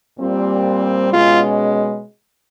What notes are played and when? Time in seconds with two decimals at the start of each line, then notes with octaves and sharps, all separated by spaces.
0.19 A#2 G3 C4
1.12 B2 G#3 C#4 F4